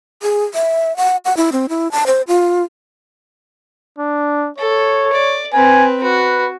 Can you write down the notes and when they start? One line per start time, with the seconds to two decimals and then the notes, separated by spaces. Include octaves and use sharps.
0.23 G#4
0.54 E5
0.97 F#5
1.25 F#5
1.37 E4
1.52 C4
1.69 E4
1.92 A5
2.07 C5
2.28 F4
3.98 D4
4.58 A4 C#5
5.13 D5
5.53 C4 B4 G#5
6.03 F#4 B4